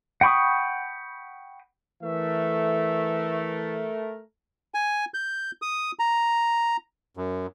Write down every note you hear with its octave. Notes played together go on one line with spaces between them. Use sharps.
F#5 G5 B5 C#6 D#6
E3 A3 A#4 E5
G#5
G6
D#6
A#5
F#2